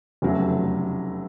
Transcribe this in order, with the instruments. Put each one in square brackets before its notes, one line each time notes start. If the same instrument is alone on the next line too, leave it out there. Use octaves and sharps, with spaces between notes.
[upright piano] F1 E2 C#3 F#3 A3